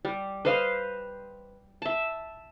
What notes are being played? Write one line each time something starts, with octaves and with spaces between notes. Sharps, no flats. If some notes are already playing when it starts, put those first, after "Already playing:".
G3
B4 C5 D#5 F5
E5 A5